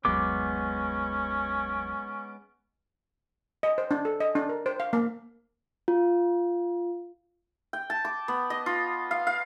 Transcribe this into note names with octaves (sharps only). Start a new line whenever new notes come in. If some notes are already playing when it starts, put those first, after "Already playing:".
G1 D#2 F#3 G#3 B3 C#4 D6
D#5
C5
D4
A4
D#5
D4
A#4
C5
F5
A#3
F4
G5
A5
D6
B3
D#5
F4
F5
F5